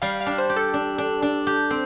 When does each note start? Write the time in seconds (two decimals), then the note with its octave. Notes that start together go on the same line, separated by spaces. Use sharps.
0.02 G3 F5
0.20 F5
0.26 D4
0.38 C5
0.50 G4
0.56 A4
0.74 D4
0.98 D4
1.22 D4
1.47 G4
1.70 C4